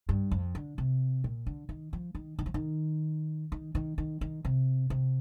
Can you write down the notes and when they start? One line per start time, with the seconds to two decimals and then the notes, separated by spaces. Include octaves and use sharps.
0.09 G2
0.31 F2
0.55 D3
0.78 C3
1.24 A#2
1.47 D3
1.69 D#3
1.93 F3
2.15 D#3
2.39 D#3
2.46 F3
2.54 D#3
3.52 D#3
3.75 D#3
3.98 D#3
4.21 D#3
4.45 C3
4.90 C3